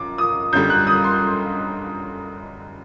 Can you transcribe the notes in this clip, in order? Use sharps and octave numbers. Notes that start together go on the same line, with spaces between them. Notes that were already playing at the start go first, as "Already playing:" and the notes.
Already playing: F#2 D6
D#6
F#2 D3 G3 G6
F#6
D#6
C6